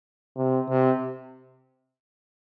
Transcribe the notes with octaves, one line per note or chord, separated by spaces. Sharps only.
C3
C3